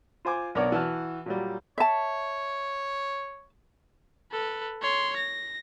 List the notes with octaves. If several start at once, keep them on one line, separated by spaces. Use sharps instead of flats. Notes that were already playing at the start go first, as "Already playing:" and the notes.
F4 C5 G#5 D6
B1 B3 D4 A#4 C#5 D5
E3 F#4 A5 F6
A#2 F#3 G3
C#5 E5 A5
A4 B4
C#5 C6
A#6